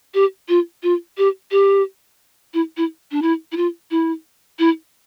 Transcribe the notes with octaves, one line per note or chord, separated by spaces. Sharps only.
G4
F4
F4
G4
G4
E4
E4
D4
E4
E4
F4
E4
E4